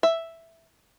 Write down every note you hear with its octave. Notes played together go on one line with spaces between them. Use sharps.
E5